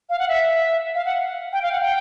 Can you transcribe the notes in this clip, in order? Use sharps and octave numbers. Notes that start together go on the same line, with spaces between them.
F5
F#5
E5
F5
F#5
G5
F5
F#5
G5